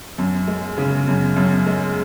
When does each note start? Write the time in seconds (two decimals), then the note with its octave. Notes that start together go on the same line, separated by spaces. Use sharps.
0.18 F#2
0.48 G#3
0.78 C#3
1.08 F#2
1.36 F#2
1.66 G#3